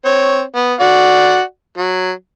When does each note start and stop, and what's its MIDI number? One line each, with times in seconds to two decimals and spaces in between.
0.05 0.42 60
0.05 0.42 73
0.55 0.74 59
0.80 1.41 66
0.80 1.41 74
0.80 1.41 78
1.78 2.11 54